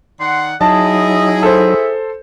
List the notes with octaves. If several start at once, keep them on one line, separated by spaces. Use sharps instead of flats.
D#3 D5 F#5 C6
F#3 D#4 E4 G#4 D#5 A5
A4 C5 E5